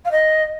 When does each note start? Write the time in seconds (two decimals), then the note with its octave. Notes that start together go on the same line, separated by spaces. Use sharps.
0.04 F5
0.11 D#5